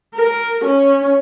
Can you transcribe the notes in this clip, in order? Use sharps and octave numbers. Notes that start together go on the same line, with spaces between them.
A#4
C#4